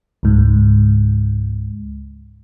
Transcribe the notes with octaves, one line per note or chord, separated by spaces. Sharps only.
C#2 G#2